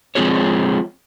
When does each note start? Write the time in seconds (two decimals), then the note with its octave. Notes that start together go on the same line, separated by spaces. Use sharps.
0.15 F3 G#3 C4 F4 G#4 C#5